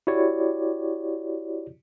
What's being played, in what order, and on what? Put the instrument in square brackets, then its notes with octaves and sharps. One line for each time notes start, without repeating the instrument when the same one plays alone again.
[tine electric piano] E4 F#4 G4 C#5 D5